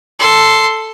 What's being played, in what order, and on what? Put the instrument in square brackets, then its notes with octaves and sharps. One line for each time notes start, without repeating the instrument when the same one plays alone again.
[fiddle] A4 C6